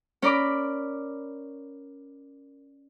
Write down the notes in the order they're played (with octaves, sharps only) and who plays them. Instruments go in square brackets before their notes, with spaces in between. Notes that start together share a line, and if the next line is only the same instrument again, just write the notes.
[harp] C#4 A#4 D5 B5 D6